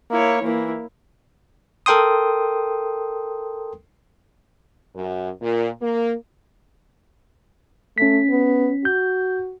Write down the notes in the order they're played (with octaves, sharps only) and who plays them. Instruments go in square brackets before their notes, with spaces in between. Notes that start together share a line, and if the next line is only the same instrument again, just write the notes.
[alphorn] A#3 [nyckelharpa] E4 C#5
[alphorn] E3 [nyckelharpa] A#3 E4
[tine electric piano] A4 A#4 G5 C6 D#6
[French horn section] F#2
A#2
A#3
[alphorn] A3 [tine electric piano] C#4 B6
[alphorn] B3
[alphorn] F#4 [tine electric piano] G6